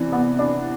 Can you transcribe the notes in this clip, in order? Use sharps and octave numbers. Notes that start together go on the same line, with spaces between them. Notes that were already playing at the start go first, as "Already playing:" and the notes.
Already playing: C3 E3 D4
B3
D4